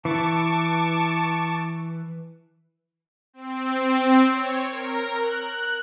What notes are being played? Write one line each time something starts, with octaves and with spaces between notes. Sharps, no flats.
E3 A5 C#6 D6
C4
C#5
A#4
F#6